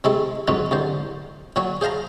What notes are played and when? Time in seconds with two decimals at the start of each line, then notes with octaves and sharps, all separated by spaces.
0.04 C3 G#3 A3 E4 A4
0.48 F2 G#2 F#3 G#3 C#4 B4
0.71 C2 D3 C5
1.56 A#2 F#3 F#4 C#5
1.81 G#4 C5 F5 A5 A#5